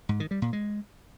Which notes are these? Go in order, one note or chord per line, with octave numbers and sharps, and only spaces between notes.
G#2
D#3
G3
A#2
G#3